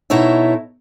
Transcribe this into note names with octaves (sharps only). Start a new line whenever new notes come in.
B2 D#4 E4 A4 C#5 E5